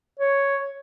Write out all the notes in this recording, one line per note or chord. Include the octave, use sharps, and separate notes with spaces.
C#5